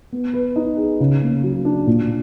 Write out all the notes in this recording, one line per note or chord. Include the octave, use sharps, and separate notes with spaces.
B3
B4
D#4
G#4
C#3
A#3
F#3
D4
A#2